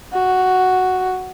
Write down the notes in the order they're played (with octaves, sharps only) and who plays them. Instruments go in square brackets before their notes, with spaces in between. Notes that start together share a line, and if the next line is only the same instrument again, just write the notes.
[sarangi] F#4